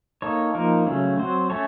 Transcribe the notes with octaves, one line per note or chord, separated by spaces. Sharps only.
A#3 D#4 A4 C#5
F3 A#3 D#4 A#4
C#3 F#3 A3 C#4
F#3 C4 F#4 C5
A3 C#4 A4 C#5